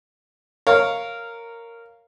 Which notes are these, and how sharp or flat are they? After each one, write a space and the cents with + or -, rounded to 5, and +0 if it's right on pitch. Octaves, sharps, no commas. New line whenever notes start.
A#4 -10 C#5 +0 F5 -5